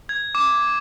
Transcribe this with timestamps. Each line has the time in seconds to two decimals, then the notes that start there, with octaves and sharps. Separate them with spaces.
0.09 G#6
0.35 D6